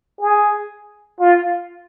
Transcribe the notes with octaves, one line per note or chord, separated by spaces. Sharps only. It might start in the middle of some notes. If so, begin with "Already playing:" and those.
G#4
F4